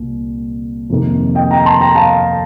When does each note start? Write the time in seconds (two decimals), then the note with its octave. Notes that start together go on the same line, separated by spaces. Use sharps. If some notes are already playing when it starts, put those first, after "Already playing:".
Already playing: C2 A#2
0.90 F2 C3 D#3 A#3
1.35 D#5 G5
1.51 G5 A#5
1.65 A5 C6
1.81 G5 A#5
1.95 F5 A5